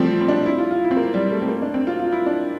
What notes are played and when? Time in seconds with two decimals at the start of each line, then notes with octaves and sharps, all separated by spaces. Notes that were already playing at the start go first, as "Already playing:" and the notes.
Already playing: F3 G3 A3 C4
0.21 C4
0.28 D4
0.46 E4
0.58 F4
0.71 F4
0.84 E4
0.91 C4
0.97 A#3
1.14 G3
1.32 A3
1.42 C4
1.48 A#3
1.62 D4
1.74 C4
1.87 F4
1.99 F4
2.12 E4
2.26 D4